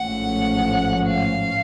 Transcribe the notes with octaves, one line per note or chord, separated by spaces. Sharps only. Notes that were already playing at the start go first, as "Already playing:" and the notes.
Already playing: A1 G#2 F3 A3 C#4 F#5
F5